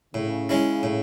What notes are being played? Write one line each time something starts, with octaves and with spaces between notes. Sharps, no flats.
A2 C#3
G#3 C#4 E4
A2